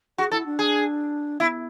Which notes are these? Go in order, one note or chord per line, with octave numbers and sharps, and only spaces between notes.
F#4 G#4
E4 A4
D4
G#4
B3 E4